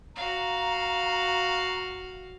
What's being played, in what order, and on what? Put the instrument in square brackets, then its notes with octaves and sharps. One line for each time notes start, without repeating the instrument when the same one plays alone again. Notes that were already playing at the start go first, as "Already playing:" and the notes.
[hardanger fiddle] F#4 F5 [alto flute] A#5